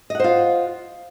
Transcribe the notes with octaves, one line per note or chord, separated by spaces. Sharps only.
F4 C5 D#5 F#5